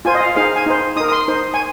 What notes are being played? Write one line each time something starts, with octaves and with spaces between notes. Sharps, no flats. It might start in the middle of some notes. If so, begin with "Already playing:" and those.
F4 C5 G#5
D#5
F5
D#4 G#4 C5 F5
G#5
D#4 C5
D#4 A#4 D#6
D#6
C6
D#4 C5
G#5